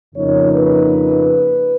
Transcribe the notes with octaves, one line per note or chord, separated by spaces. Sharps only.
F2 C#3 F3 A#3 D#4 C#5
B4